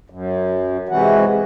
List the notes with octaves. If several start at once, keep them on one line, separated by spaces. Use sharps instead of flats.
F#2
G#2 C3 E3 F#4